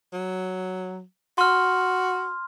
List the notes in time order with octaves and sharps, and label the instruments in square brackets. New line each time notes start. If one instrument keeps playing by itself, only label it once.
[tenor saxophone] F#3
[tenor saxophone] F#4 [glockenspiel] C6 F6